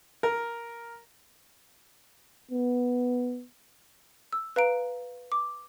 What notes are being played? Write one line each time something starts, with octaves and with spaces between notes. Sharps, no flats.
A#4
B3
E6
B4 F5 A#5 D7
D6